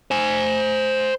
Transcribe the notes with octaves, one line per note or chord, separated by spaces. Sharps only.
C5 G#5